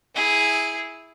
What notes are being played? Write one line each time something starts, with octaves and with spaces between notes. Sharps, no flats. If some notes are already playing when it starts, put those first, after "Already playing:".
E4 G#4